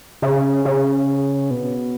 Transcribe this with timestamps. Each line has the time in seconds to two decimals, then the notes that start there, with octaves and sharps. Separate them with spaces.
0.22 C#3
0.65 C#3
1.51 B2